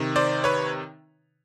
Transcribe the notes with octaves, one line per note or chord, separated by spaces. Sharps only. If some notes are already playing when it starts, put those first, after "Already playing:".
Already playing: C3 D#3
C5 D5
B4 C#5